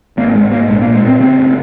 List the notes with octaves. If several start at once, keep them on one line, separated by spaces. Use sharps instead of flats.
G#1 A#3
G#2 G#3
G#2 A#3
A#1 G#3
A#3
A#2
G#3
A#2 C4
C#3 C4
F#1